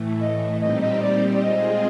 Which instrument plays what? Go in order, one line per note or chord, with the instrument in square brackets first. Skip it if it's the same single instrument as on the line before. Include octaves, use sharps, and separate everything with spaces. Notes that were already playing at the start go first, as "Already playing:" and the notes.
Already playing: [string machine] A2 E3 A3
[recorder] D#5
[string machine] A#2 G3 C4 D#4 G4 [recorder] D#5
[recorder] D#5
D5
D5
[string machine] G#3 C4 F4 G#4 [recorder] D#5